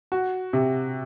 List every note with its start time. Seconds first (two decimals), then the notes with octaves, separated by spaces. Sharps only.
0.12 F#4
0.53 C3